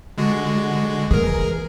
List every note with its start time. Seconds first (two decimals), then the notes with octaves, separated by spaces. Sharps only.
0.18 D3 G#3 F#4
1.11 E3 A#3 G#4 A#4